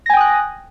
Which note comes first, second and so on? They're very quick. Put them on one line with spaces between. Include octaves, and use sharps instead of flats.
A#6 G#5 G5 D#6 F#6